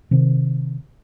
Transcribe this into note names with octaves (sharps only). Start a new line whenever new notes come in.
C3 D#3 C4